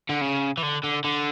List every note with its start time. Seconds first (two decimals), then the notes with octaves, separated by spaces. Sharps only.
0.09 D3
0.21 C#3
0.57 E3
0.63 D3
0.83 D3
1.04 D3